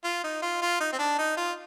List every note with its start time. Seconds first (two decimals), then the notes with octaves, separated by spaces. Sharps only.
0.04 F4
0.24 D#4
0.42 F4
0.62 F4
0.80 D#4
0.93 C4
0.99 D4
1.19 D#4
1.37 F4